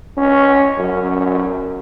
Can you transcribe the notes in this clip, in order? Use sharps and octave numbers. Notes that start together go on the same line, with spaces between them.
C#4
F#2